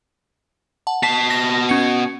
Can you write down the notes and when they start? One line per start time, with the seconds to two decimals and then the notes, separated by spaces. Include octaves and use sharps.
0.87 F#5 A5
1.03 B2 A5 B6 C7
1.30 A#6
1.69 C#4 C#7